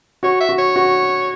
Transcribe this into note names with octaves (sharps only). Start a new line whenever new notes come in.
F#4 C#5
E5
F#4
C#5
F#4